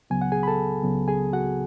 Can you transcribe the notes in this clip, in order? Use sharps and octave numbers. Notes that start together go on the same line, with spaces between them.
C#2 C#3 F#3 B3 G#5
F#5
G#4 G#5
B5
A4 A5
C#2 C#3 F#3 B3
G#4 G#5
F#4 F#5